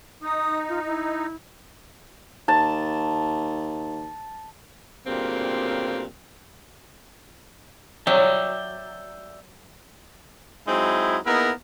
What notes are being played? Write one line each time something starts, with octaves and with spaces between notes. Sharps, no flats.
D#4 D#6
F4
E4
D#2 A5
D2 G2 A#2 C#3 A#3 C4
F#3 D5 E5 G5
F#3 G#3 C4 D#4 E4
A#3 B3 D#4 E4 G#4 A#4